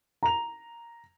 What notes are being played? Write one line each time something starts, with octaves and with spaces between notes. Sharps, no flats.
A#5 F7